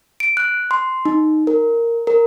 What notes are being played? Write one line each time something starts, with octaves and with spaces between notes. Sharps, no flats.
D7
F#6
C6
D#4
A#4
A#4